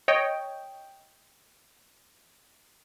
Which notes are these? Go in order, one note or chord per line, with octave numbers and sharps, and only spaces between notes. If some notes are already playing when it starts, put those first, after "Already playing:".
C#5 D#5 G5